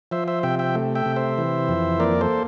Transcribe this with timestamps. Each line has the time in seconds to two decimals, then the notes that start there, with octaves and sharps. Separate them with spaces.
0.11 F3 C5 E5
0.28 C5 E5
0.43 C3 E5 G5
0.59 E5 G5
0.75 A3
0.95 E5 G5
1.06 C3
1.16 C5 E5
1.38 E3
1.69 F2
2.00 A#3 A#4 D5
2.21 A4 C5